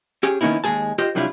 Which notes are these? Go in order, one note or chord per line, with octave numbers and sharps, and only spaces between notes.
C#4 G4 G#4
D#3 A#3 B3 C#4 D#4 E4
D#2 E3 G#3 G#4 A5
F4 G4 C5 D#5
C3 F#3 G3 D4 E4 F4